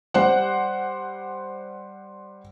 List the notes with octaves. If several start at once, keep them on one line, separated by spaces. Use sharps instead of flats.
G3 C5 F#5